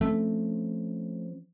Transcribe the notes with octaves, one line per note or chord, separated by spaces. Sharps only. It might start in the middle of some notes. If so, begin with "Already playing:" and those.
F3 A3 C4 C#4